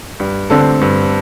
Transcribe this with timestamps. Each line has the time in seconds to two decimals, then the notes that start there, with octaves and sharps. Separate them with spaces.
0.20 G2
0.50 D3 C4 A4
0.81 G2